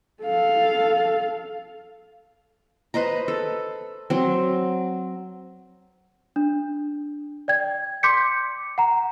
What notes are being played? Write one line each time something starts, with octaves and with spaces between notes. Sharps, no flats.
A4 F5
B4 C5 D#5 A#5
A4
F#3 C4
D4
D5 G5 G#6
C6 D6 G6 B6 C#7
F#5 A#5